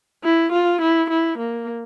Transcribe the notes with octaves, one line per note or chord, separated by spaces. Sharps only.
E4
F4
E4
E4
A#3